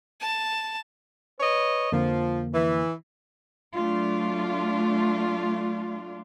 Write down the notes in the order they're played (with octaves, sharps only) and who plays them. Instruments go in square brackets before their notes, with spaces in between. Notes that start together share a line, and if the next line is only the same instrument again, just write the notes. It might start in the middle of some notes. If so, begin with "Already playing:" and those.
[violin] A5
[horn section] B4 C#5 D#5
[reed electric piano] F2 D3 A#3 [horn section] F3
[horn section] E3
[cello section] F#3 A3 D4 F4